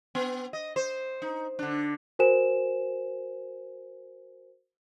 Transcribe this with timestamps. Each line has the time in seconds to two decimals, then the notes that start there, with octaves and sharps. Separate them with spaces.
0.15 B3
0.53 D#5
0.76 C5
1.22 D#4
1.59 D3 D4
2.19 F#4 A#4 C5 G#5 E7